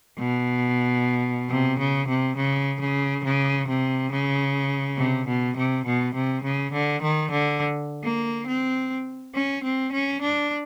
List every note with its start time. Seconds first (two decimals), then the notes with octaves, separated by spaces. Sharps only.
0.19 B2
1.50 C3
1.79 C#3
2.08 C3
2.37 C#3
2.81 C#3
3.24 C#3
3.68 C3
4.12 C#3
4.98 C3
5.28 B2
5.57 C3
5.86 B2
6.15 C3
6.44 C#3
6.73 D3
7.03 D#3
7.31 D3
8.04 A#3
8.47 C4
9.35 C#4
9.64 C4
9.93 C#4
10.22 D4